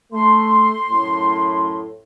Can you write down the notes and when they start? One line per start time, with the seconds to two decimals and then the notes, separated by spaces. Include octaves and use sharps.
0.13 A3 C6
0.90 F#2 A2